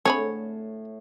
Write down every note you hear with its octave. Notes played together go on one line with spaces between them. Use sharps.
A2 D3 A3 C4 G#4 A4 C#5 B5